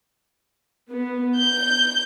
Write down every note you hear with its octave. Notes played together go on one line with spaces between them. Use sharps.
B3
G6